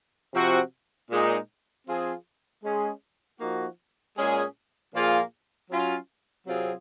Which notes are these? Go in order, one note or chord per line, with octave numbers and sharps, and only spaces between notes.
C3 F3 C4 F#4
A#2 G#3 D#4
F3 C4 F4 G#4
G#3 C#4 G#4
F3 A#3 D#4 F#4
A#2 G#3 C#4 G#4
A#2 F3 A#3 F4 G#4
F#3 C#4 F4
C3 F#3 C4 F4 G#4